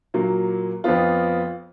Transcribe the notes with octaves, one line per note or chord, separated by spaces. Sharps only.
A#2 F#3 A#3
F2 F3 B3 F4